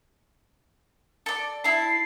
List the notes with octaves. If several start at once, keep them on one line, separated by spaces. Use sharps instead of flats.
A4 D5
E4 A5 C7